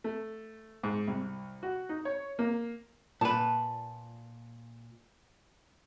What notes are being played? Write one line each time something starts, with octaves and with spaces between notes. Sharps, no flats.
A3
G#2
C2
F#4
D#4
C#5
A#3
A#2 B4 A5